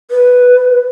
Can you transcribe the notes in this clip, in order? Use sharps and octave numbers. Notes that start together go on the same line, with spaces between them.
B4